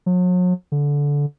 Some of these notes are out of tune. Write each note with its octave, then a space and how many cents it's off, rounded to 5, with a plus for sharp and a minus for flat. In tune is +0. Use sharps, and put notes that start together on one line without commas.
F#3 -40
D3 -20